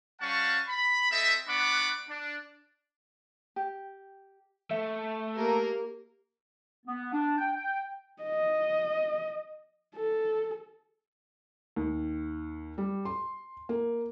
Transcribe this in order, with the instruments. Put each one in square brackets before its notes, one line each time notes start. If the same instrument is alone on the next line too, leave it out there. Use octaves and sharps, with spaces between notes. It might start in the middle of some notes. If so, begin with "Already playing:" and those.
[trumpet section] G3 C#4 F5 F#5 A5 C#6
B5
C4 A4 D#5 E5
B3 D4 F#5 B5 C#6 D6
D4
[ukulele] G4
[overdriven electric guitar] A3 [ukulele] E5
[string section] A#3 A#4 [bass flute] G4
[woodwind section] B3
D4
G5
G5
[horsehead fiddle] D#5
A4
[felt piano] D#2
G3
C6
A#3